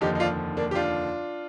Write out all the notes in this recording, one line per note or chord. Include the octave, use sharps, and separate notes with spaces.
F1 D#2 D3 F3 D#4 G4
D#4
D4 F4
A#3 D4
G4
D4 F4